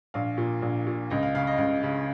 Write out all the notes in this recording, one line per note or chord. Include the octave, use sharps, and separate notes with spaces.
A#1 F5
A#2
A#1
A#2
C#2 D#5
F5
C#3 F5
D#5
C#2 F5
C#3